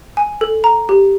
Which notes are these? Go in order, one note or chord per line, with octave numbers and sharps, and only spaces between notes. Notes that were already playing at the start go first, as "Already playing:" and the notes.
G#5
A4
A#5
G4